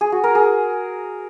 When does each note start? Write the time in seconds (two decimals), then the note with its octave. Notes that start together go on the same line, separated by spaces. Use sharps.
0.01 G#4
0.12 F#4
0.24 A#4
0.35 G#4